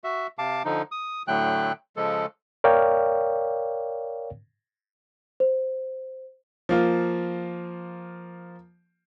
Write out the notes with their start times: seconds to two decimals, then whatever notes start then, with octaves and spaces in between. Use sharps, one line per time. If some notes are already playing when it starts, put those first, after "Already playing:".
0.04 F#4 E5
0.38 C3 F5 A5 D6
0.65 D3 F3 D#4
0.92 D#6
1.28 A2 D3 F#3 A3 G5 F#6
1.97 C#3 F3 G#3 A4
2.64 A#4 C#5 D5 F5 G5
5.40 C5
6.69 F3 A#3 F4